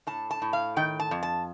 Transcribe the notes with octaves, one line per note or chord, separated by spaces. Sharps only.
A2 A5
A5
A2
F5
D#3 G5
A5
F2
A5